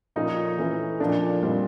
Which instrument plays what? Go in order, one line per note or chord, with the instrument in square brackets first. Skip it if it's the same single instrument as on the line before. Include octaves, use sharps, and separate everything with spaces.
[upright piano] A#2 F3 A3 C#4 F4 [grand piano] D#4
[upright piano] E3 A3 C#4 E4
[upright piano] A#2 F3 A3 [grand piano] D4
[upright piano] A#2 G3 C4 D#4